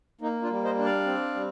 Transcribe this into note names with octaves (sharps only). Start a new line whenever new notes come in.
A#3 D#4
D4 F4
G3
C5 D#5
D4
D5 F5
C4
G3